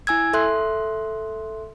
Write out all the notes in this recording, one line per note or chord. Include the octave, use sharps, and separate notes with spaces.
E4 G#5 E6 G#6
A4 E5 C6 F#6